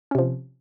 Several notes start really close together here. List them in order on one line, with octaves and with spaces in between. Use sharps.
C#4 C3 F3